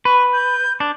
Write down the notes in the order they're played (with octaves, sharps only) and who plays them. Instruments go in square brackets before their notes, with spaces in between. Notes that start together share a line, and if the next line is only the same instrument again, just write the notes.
[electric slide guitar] B4 [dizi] C#6
[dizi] G6
[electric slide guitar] D4